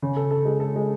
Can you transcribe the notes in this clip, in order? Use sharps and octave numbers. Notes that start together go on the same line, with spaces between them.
C#3
A4
A4
G#3
A4
G#3